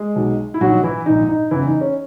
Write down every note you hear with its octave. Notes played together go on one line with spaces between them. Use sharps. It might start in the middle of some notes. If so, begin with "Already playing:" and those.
Already playing: G#3 G#4
B1 B2
E4
A#1 G#2 D#3 F#3 F#4
E3 E4
A#1 G#2 D#3 D#4
D#4
F#1 E2 C#3 E3 E4
D#4
C#4